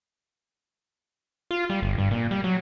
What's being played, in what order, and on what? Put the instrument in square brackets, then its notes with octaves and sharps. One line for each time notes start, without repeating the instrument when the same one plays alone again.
[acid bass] F4
G3
G1
G2
A#2
G3
F#3